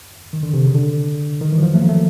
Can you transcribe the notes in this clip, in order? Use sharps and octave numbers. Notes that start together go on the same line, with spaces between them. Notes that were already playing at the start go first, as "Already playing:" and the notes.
D#3
D3
C3
C#3
D3
D#3
E3
F#3
F3
A3
A#3
A3